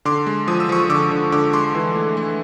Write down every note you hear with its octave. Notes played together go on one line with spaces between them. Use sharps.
D3 C6 D6
G#3
F3 D#6
E6
F3 C#6 D#6
D3 D6 E6
D3
D3 D6 E6
G#3 C6 D6
E3
A3
A3